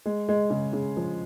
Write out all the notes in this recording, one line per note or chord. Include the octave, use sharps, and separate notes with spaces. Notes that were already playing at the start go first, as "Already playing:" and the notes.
G#3
G#3
C#3
C#3
F3